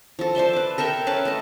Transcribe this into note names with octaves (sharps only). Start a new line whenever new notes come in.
F3 A4
C5 D5 E5 C6
B4 D6
A4 A#4 E5 G5
C#4 B4 E5 A5
A3 D#5